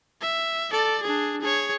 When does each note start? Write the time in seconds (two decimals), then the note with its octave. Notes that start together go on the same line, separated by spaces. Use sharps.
0.22 E5
0.72 A4 D5
1.03 D4 G#4
1.41 G#4 C#5